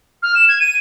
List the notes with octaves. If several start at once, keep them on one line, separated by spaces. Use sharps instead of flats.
F6
E7
G#6
D#7